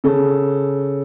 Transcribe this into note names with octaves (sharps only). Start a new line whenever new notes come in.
C#3 A4